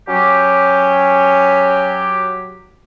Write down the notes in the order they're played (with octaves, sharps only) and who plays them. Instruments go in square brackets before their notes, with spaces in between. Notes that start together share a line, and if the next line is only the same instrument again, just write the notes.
[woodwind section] F#3 G4 [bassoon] C#4